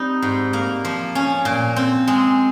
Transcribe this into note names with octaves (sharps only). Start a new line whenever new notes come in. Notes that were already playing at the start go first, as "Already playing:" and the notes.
Already playing: G3 C4 D#4
G#2
A#3
F3
C#4
A#2
C4
G#3